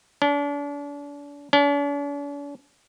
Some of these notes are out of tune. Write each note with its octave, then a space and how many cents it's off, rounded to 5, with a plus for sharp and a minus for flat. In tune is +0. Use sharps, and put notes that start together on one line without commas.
D4 -35
D4 -45